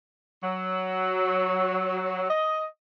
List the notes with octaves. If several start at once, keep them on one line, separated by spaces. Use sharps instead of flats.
F#3
D#5